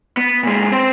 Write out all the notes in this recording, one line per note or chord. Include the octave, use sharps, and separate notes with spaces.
B3
A#2 G#3
C4 C5